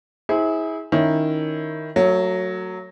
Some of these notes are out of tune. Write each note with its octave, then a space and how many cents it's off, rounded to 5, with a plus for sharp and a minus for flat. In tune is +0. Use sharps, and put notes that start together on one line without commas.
E4 -30 G#4 +0 C5 +0
D#3 +0 C#4 +0 E4 +0
F#3 +0 A3 +35